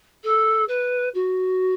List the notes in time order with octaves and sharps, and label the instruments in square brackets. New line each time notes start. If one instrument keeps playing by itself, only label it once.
[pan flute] A4
B4
F#4